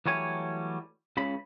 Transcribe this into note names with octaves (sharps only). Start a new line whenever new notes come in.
E3 F#3 G3 A3 C#5 G#5
C#2 C#3 B5